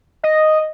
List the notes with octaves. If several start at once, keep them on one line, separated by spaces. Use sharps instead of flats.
D#5